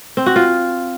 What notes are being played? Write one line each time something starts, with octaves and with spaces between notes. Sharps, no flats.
C4
F#4
F4